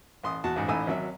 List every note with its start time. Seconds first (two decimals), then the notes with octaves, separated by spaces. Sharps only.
0.23 A1 C6 D#6
0.44 E2 F#4 A5
0.56 A1 G#2
0.68 A1 A2 D#4 G#5 E6
0.87 G#1 F#3 E5